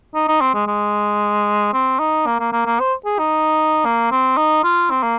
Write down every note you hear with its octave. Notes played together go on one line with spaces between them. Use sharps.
D#4
D#4
C4
G#3
G#3
C4
D#4
A#3
A#3
A#3
A#3
C5
G#4
D#4
A#3
C4
D#4
F4
C4
A#3